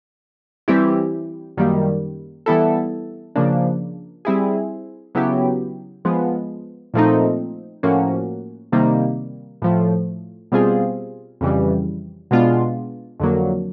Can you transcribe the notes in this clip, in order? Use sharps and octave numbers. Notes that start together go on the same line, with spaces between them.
E3 G3 C4 E4 G4
F#2 D#3 G3 A#3
E3 G3 B3 E4 A4
C#3 F3 A#3 D4
G3 C4 E4 G#4
C#3 F#3 B3 E4 G4
F3 G#3 B3
A#2 F3 A3 C4 D#4
A2 F3 A#3 C#4 F#4
C3 D#3 G3 A#3
A2 F3 A3
B2 G3 C4 F4 G#4
F2 C#3 E3 G3
B2 G#3 B3 D4 F4
F2 D3 F#3 A#3